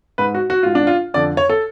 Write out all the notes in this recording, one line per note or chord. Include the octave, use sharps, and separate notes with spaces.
G#2 B4
F#4
F#4
G#2 F4
D4
F4
F2 D3 D5
C#5
A4